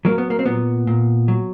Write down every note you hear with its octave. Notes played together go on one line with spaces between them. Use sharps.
F#3 A#3
B3
A#3
C4
A#2 B3
A#2
F#3